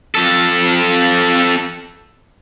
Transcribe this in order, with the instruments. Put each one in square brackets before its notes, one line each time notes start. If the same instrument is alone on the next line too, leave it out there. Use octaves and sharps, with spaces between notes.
[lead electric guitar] F2 A4